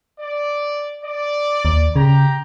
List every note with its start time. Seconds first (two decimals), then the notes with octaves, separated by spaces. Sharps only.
0.20 D5
1.04 D5
1.65 D#2
1.96 C#3 G4 A#5